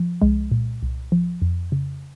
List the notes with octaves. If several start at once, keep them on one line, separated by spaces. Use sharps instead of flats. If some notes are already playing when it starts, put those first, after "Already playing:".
Already playing: F3
C2 G#3
A#2
C2
F3
F2
C#3